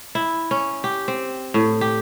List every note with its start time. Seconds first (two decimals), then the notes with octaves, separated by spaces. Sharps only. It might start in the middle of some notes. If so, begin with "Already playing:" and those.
0.15 E4
0.51 C#4
0.84 G4
1.08 C4
1.54 A2
1.81 G4